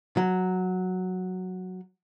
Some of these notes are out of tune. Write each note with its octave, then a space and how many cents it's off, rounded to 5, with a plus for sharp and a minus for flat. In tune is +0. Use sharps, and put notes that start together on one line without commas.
F#3 -5